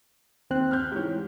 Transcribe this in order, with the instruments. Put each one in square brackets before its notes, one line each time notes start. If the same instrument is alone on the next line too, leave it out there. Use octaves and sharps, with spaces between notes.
[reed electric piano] D#2 C4 F#6
[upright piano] F6 G6
[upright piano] G#2 E3 [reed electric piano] G4 C#5